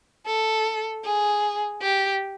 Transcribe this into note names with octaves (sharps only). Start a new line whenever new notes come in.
A4
G#4
G4